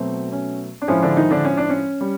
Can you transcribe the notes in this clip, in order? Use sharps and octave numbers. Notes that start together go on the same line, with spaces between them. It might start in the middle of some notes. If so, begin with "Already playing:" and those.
Already playing: B2 F#3 A3 C4
C#4
D4
A2 F3 G#3 C#4
D3 D4
D#3 D#4
D3 D4
C#4
D4
C#4
G3